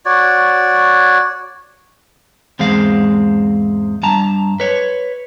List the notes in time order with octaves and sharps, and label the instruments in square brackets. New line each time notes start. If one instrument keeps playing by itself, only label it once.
[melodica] F#4 C#5 D5
[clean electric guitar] E2 G#2 G#3 C4 F5
G2 A5 A#5
B4 C#5